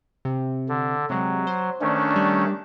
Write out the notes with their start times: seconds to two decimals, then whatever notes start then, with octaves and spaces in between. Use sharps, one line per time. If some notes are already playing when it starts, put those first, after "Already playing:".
0.25 C3
0.69 D3
1.10 C3 F#3 G#3
1.47 C5
1.81 D#3 A3 C#4 D4
2.16 G3